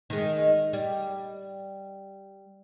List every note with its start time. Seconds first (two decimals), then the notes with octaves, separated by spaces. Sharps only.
0.10 D#3 G#3
0.73 G3